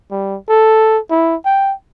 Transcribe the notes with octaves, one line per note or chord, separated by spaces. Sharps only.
G3
A4
E4
G5